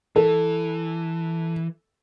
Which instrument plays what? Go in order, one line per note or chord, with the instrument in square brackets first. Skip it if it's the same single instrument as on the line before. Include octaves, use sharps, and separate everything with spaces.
[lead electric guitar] E3 [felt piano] A4